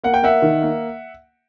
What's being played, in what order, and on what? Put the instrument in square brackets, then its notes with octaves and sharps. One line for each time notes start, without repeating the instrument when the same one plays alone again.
[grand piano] A#3 F#5
G5
A#3 E5 F#5
D#3
A#3